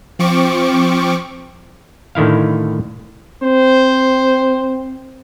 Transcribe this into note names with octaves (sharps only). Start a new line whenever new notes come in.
F3 C4 C#6 D6
A2 D3 D#3 E4 F5
C4 C5